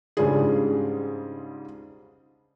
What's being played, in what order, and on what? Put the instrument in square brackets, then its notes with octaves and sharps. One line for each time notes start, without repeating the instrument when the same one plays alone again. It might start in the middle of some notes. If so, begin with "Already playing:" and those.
[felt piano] G#2 C#3 G3 D4 F4 G#4